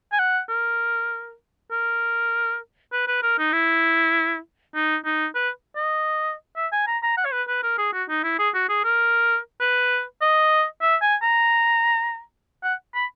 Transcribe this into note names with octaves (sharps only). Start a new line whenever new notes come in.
G#5
F#5
A#4
A#4
B4
B4
A#4
D#4
E4
D#4
D#4
B4
D#5
E5
G#5
A#5
A#5
F#5
C#5
B4
B4
A#4
G#4
F#4
D#4
E4
G#4
F#4
G#4
A#4
B4
D#5
E5
G#5
A#5
F#5
B5